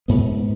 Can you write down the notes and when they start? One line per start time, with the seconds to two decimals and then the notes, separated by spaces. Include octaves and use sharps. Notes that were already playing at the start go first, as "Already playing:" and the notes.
0.08 G#2 B3